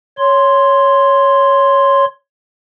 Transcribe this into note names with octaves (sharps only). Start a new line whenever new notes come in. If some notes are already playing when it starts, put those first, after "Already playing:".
C#5 C6